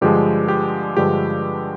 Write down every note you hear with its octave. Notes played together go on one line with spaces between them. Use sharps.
G2 D3 F3 G#3 G4
G4
G2 D3 F3 G#3 G4